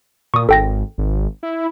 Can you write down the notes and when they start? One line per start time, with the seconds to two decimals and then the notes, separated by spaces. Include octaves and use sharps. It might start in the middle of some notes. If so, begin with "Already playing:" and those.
0.34 A#2 C#6 D#6
0.49 G#1 A4 G5 A#6
0.98 G#1
1.43 E4